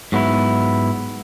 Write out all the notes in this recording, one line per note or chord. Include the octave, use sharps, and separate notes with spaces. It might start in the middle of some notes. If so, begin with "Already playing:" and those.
G#2 F#3 B3 E4